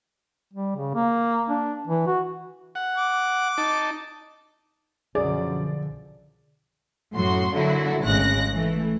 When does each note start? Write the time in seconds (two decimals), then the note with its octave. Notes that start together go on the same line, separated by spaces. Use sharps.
0.53 G3
0.76 C#3
0.95 A#3
1.50 D4
1.87 E3
2.07 F#4
2.75 F#5
2.97 D6
3.58 D#4 A5
5.15 B1 F#2 D3 F3 G#4 D5
7.15 F#2 A2 F#3 F#4 C6
7.53 D3 F#3 A#3 E4 F#4
8.03 G#1 D2 C#3 G#3 F#6 A#6
8.53 E3 A3